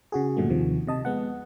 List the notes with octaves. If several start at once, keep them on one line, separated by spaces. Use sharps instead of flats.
C#3 F#4 G#4
G2 A#2 D3 F#3 A3
D#2 C3 D#3 F3
C3 D#5 A5
G#3 B3 F#5